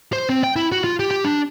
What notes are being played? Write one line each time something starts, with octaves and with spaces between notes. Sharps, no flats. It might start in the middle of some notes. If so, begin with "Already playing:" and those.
C5
C4
G5
E4
F#4
F4
G4
G4
D4